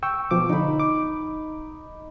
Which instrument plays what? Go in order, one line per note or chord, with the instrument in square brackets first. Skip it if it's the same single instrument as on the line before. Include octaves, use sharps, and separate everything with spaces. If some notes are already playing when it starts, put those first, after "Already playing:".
[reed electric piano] G5 C#6 E6
B2 F3 D6
[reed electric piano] D3 [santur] D#4 B5
[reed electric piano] D6